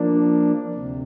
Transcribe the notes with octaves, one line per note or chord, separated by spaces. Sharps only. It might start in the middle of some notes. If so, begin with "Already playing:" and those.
Already playing: F3 A#3 D4
D2 C3